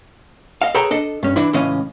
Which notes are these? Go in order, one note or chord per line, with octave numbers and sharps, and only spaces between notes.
D#5 F5
G#4 A4 B4 C#5 G5 A#5
D4 A4 D#5
G2 C#4
E3 D4 E4
C#2 A2 E3 C#4 D#5 F5